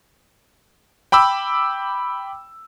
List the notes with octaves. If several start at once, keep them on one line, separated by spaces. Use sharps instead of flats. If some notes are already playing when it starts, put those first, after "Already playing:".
G5 B5 D6 E6